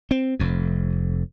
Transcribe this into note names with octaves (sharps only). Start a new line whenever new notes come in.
C4
F1 F2